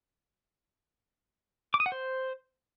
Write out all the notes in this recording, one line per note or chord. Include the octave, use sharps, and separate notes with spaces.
D6
D#6
F#5
C5